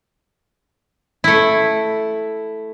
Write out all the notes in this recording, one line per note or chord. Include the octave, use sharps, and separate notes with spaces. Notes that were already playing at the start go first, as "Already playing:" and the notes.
A3 E4